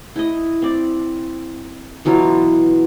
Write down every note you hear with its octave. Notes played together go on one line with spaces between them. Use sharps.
E4 D#5
C4 D5
B2 E3 F#3 F4